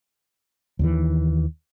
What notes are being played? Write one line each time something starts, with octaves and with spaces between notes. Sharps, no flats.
D#2 D#3 E3